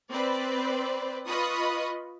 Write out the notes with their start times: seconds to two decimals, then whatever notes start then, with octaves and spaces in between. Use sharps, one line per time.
0.11 C4 B4 C5 D5
1.27 F4 B4 D#5 B5 C#6 D#6